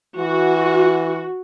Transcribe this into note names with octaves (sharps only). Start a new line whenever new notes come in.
E3 F#4